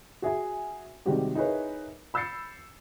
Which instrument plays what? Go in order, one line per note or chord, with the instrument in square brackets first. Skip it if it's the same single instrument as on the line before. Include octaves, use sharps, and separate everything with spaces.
[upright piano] F#4 G#4 E5 G#5
C3 D#3 G3 G#3 F#4 G4
D#4 E4 G#4 A#4 B4 C#5
B5 E6 G6 A6 C7 C#7